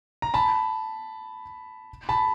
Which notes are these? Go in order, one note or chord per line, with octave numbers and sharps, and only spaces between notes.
A#5
A5 B5
A5 B5